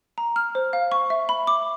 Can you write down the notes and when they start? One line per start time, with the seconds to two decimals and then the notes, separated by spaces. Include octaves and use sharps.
0.18 A#5
0.36 F6
0.55 C5
0.73 F5
0.92 C#6
1.10 E5
1.29 B5
1.47 D6